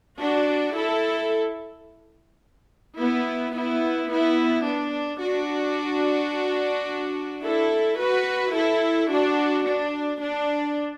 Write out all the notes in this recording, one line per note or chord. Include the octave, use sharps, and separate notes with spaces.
D4 F#4
E4 A4
B3 E4
B3 E4
B3 E4
D4
D4 F#4
E4 A4
F#4 B4
E4 A4
D4 F#4
D4
D4